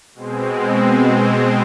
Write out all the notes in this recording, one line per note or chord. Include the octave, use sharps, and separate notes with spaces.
B2 G#3 C4